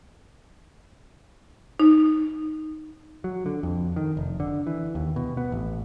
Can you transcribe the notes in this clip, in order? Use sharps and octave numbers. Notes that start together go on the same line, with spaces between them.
D#4
F#3
D3
F2
D#3
F1
D3
E3
D#2
B2
B3
A1